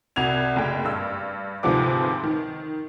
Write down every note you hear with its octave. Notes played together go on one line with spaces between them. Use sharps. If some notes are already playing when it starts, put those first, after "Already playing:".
C2 F#4 G#6 F7
F#1 A3 G5
G2 E6
D2 G#2 C3 F3 B4 D6
D#3